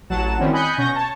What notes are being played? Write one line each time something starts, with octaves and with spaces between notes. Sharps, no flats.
A1 F#3 F#5 A5 E7
D#3 G3 C4 C#4 E4
D#5 G#5 B5 F#6 G6 C#7
B2 C#4 C#6 G6 A#6
C#5 A5